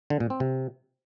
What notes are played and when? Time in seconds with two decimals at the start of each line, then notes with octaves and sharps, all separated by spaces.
0.10 D3
0.20 A#2
0.30 C4
0.40 C3